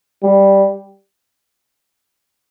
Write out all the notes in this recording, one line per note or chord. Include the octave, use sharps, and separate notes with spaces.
G3